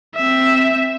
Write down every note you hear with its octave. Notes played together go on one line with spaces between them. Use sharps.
C4 E5